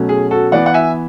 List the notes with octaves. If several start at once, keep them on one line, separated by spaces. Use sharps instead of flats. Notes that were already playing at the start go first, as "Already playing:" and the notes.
Already playing: B2 F#3 A3 C#4
G#4
F#4 A4
E3 B3 D5 F#5
F#5
E5 G#5